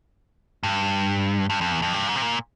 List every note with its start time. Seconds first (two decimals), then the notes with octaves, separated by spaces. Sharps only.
0.63 G2
1.50 G2
1.61 F2
1.72 E2
1.82 F2
1.93 G2
2.08 G#2
2.16 C3
2.22 A#2